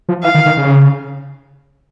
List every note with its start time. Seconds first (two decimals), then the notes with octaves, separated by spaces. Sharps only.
0.09 F3
0.23 E3 F5
0.35 D#3
0.46 D#3
0.57 C#3